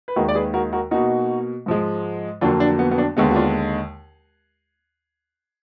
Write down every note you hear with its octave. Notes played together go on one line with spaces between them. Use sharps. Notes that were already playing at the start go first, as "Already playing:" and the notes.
B4
D#2 D#3 G#3 F#4 A#4
D5
G#4 B4
F#4 A#4
F#4 A#4
B2 A#3 D#4 F#4
G#2 F3 G#3
F2 D3 F#3 A#3 D4 F4
D4
B3
B3
D4
D#2 D3 G#3 B3
F#4
D4 F4